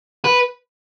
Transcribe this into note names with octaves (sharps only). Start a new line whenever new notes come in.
B4